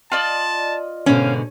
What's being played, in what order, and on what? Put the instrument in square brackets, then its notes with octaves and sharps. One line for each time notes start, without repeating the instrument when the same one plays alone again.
[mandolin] F4 D5 D#5 [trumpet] A5
[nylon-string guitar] G#2 B2 D3 [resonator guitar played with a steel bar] C#4 [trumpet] F5